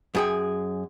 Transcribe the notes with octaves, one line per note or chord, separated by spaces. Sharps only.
F#2 G#4 G5